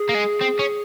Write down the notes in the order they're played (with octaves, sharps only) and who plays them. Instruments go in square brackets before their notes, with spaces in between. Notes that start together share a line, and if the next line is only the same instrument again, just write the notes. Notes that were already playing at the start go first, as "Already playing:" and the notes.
Already playing: [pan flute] G#4
[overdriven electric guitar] A#3
G#3
C4
C#4